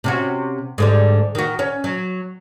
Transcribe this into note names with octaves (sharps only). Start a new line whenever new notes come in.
C3 C#4 F#4
G#2 D3 G3
D#3 F#4
C#4
F#3